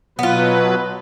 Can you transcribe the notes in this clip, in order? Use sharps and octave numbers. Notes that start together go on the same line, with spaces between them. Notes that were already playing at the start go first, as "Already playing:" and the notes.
B2 F#3 B3 F4 B4